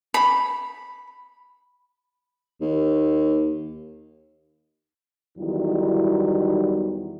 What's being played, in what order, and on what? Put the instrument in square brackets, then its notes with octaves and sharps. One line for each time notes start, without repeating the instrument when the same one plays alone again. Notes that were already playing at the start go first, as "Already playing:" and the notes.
[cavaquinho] B5
[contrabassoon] D#2
[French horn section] E2 D#3 F#3 G3 D#4 E4